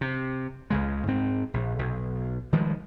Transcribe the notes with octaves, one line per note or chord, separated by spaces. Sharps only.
C3
C#2 C#3 G#3
G#2 C4
A#1
B1
D#3 F3 G3 G#3